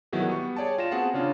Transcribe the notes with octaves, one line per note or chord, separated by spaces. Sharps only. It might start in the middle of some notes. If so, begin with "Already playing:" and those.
D#3 F#3 B3 E4 F#4 G#4
G3 B3 C#6
G#4 C#5 D5 G5 A5
F4 A#6 E7
B3 C4 F#4 G#4 F#5 A5
C#3 C#4 D4 F4